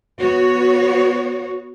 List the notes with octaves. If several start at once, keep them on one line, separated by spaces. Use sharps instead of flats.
B3 F#4 C#5